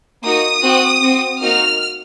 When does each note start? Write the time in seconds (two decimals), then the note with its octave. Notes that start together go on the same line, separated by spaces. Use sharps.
0.23 A#3 D#4 F#4 D#6
0.63 C4 F#4
1.02 C4 F#4
1.41 A#3 D#4 F#4 F6